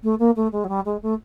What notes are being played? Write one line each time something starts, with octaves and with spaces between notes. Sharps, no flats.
A3
A#3
A3
G#3
F#3
G3
G#3
A3